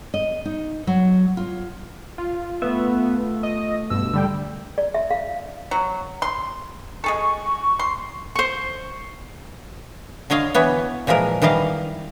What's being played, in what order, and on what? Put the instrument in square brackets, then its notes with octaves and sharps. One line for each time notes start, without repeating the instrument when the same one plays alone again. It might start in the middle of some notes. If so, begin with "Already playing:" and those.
[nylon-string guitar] D#5
D#4
F#3
F4
[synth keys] F4
[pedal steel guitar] A3 E5 [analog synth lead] B3
[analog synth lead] D#5
[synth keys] G2 B2 [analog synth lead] E6
[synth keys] D3 G3 G5
[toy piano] D5
E5
F5
[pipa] F#3
C6
[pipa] G#3 G#4 A4 [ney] C#6
[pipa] C6
[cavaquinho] C5 C#6
[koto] D3 C#5 D#5 F5
E3 B3 C#5
A#2 E3 F3 G#3 A#4
D#3 E3 G3 D#5 F5